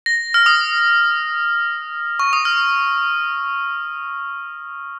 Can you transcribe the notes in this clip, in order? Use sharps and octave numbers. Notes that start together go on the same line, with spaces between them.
A#6
F6
D#6
C#6
D#6
F6